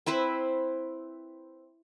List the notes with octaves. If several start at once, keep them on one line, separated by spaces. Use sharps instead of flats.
C4 E4 B4 C5